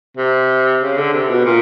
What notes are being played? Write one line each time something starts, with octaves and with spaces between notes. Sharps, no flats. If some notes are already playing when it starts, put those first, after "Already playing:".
C3
C#3
D3
C3
B2
A#2